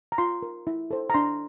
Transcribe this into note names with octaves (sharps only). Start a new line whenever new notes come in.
A#5
F4 C6
A#4
E4
A4 C5
A#5
D4 C6